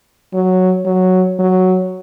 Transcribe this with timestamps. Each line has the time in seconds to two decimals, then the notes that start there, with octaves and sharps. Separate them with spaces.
0.34 F#3
0.85 F#3
1.39 F#3